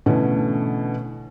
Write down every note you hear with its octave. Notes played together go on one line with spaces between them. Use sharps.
B2 D3 E3 A3 C#4